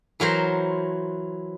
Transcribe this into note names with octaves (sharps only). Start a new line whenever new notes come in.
E3 F#3 A#4 C5